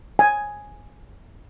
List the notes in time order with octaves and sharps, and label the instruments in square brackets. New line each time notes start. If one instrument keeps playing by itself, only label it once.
[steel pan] G#5